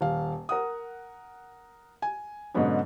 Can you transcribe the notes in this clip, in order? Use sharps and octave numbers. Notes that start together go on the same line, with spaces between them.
D#1 F5
A#4 F#5 D#6
G#5
G#2 B2 D3 F#3 B3 C#4